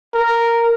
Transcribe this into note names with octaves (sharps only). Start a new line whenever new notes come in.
A#4